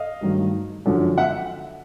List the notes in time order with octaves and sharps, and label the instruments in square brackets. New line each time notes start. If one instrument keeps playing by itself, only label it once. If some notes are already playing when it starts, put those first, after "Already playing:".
Already playing: [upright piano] D#5 F5
G2 D#3 F#3 A3
F#2 D3 F3
E5 F#5